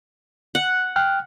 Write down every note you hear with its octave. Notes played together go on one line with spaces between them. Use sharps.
F#5
G5 F6 F#6